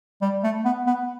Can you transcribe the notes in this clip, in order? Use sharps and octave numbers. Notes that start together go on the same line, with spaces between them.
G3
A3
B3
B3